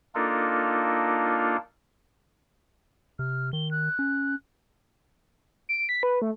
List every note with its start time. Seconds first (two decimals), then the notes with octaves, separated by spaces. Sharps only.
0.15 A#3 D4 D#4 F4 A4 A#4
3.19 C3 F6
3.53 D#3 G7
3.71 F#6
3.99 C#4
5.69 D7
5.89 B6
6.03 B4
6.22 A3